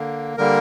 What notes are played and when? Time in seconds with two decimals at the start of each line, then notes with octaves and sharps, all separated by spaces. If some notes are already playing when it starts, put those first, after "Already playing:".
Already playing: D3 A#3
0.37 D3 G3 A#3 A#4